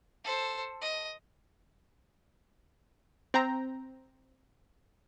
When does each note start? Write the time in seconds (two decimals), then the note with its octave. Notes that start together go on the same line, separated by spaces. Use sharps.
0.24 A4 C5
0.81 D#5
3.34 C4 G5 A#5